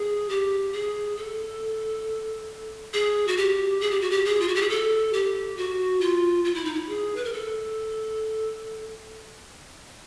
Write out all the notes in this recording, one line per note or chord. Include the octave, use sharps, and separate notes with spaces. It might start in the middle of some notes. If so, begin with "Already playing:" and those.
Already playing: G#4
G4
G#4
A4
G#4
F#4
G4
G#4
G4
F#4
G4
G#4
F4
F#4
G4
G#4
A4
G4
F#4
F4
F4
E4
D#4
E4
G#4
B4
A#4
A4